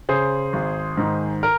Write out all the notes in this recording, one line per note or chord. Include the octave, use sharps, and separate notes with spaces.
C#3 G#4 C5
G#1
G#2 D#3
A#4